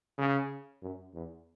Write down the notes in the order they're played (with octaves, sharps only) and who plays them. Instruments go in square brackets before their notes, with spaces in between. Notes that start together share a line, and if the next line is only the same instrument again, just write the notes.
[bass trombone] C#3
F#2
E2